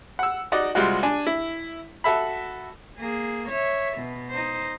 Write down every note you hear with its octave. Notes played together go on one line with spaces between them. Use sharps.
F#5 E6
D#4 F#4 D5 D#5
C3 G3 G#3 F4 F#4
D4 G#5
E4
F#4 A4 E5 B5
A#3 G#4
C#5 E5
B2
D#4 C5